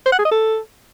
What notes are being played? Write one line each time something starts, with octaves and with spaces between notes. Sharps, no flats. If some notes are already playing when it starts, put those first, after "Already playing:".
C5
F#5
G#4
D#5
A4